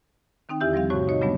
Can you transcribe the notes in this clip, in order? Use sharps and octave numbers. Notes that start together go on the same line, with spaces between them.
D#3 C4 D#4 G5
E2 D3 E4 G4 E5 G6
F3 G3 C4 F5
G#2 C3 A3 F#4 C#5 C#6
D#4 C#5 D#5
C#3 F#3 G3 A3 B3 D4